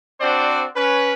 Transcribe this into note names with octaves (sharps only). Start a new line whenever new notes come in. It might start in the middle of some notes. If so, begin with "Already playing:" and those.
C4 D4 F#4 C5 D5
C#4 B4